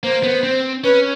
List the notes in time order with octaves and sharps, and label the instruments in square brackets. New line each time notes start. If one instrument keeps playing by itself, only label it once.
[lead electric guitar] A#3 [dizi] C5
[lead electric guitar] B3
C4
[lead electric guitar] C#4 [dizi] B4